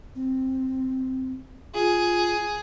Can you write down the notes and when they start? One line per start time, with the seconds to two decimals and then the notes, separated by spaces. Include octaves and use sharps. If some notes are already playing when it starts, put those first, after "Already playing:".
0.15 C4
1.74 F4 G#4